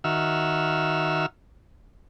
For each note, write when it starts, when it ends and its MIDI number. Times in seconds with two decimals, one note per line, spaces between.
0.04 1.26 51
0.04 1.26 66
0.04 1.26 76
0.04 1.26 88
0.04 1.26 89